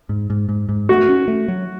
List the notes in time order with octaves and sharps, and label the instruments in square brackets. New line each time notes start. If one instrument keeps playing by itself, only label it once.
[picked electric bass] G#2
G#2
G#2
G#2
[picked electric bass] A3 [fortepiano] F#4
[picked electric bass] C#4
A3
F#3